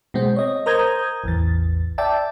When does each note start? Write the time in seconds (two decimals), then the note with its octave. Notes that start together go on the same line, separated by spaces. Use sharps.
0.14 B2 G#3 C4
0.36 C#5 D#5
0.66 A#4 C5 A#5 D#6 G6 G#6
1.24 A1 E2 A6
1.98 D5 E5 G5 A5